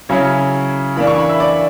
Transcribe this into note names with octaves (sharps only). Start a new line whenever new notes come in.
C#3 F#3 C#4 E4 C#5
E3 A#3 D4 B5
C#6
B5
E5
D5